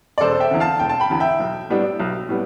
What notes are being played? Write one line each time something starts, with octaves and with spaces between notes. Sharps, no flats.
D5
E1 A4 C5
E5 G5
E2 D3
F5 A5
E1 G5
A5
G5 B5
E2 D3
E5 G5
B1
A2 G3 B3 D4
B1
A2 G3 B3